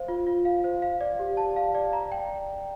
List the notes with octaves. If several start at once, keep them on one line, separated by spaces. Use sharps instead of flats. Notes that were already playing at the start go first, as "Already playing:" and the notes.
Already playing: C5 F5
F4
F4
F5
C5
F5
D5
G4
A5
F5
D5
A#5
G5